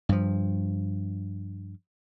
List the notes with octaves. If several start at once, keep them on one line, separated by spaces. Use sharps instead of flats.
G2 F3